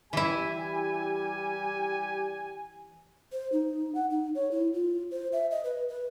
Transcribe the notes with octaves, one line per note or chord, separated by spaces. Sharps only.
E3 G3 E4 G4 G#5
C5
D#4
F#5
D#4
C#5
E4
F4
C5
E5
D#5
B4
B4